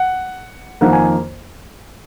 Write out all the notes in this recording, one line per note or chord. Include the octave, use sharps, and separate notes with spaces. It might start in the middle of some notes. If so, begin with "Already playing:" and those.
Already playing: F#5
F2 D#3 A#3 F#5
G#5